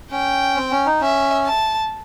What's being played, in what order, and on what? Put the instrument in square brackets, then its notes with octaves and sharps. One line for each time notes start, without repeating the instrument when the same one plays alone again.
[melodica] C#4 [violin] G5
[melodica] C4
C#4
D#4
[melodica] C#4 [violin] E5
[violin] A5